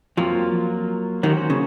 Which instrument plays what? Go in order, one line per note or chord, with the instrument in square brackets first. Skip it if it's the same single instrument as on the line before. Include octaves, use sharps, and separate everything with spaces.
[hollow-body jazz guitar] F2 F3 [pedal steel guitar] F#3 A#3 F4
[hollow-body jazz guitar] D#2 D#3 [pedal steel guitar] F#3 A#3 C#4 F#4 C5
[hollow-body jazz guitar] C#3